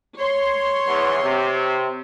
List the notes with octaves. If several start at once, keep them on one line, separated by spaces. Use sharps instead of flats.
C#5 C6
E2
C3